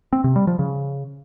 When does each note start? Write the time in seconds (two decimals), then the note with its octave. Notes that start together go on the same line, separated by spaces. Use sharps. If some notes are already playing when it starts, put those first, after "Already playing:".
0.13 C4
0.24 C3
0.36 G3
0.47 F3
0.59 C#3